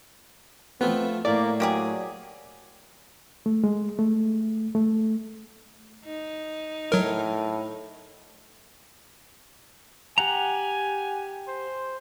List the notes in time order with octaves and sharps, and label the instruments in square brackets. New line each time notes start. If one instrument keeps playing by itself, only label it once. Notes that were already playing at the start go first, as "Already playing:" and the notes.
[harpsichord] F3 A3 F4 [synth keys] B3 [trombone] C4
[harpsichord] A2 [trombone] A#3 [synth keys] D5
[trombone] F#3 [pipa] A#3 G4 G#4
[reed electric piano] A3
G#3
A3
A3
[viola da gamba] D#4
[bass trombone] A2 [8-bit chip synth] F#3 A#4
[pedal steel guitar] G4 F#5 A#5 [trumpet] G#5
[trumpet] C5